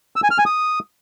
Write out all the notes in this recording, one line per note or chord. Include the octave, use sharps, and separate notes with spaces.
E6
G#5
F6
G#5
D#6